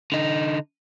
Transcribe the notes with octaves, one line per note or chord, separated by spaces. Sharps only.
D3 D#4